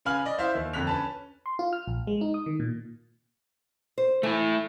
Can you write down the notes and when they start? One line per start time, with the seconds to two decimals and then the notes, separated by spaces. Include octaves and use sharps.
0.05 C#3 B4 F5 G#5 F6 F#7
0.25 D5 D#5
0.38 E4 C5 E5 F5
0.55 D#2
0.73 F2 D3 F#6 B6 F7
0.87 C#4 B4 A5
1.46 C6
1.59 F4
1.73 F6
1.88 A#1
2.07 G#3
2.21 D#4
2.34 D#6
2.46 D#3
2.60 A#2
3.98 C5
4.23 E3 A3 E4